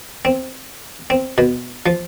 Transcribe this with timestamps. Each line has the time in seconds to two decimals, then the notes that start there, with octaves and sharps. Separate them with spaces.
0.25 C4
1.10 C4
1.38 B2
1.86 F3